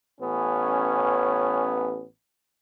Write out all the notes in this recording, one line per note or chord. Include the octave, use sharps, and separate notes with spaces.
A1 B3 C#4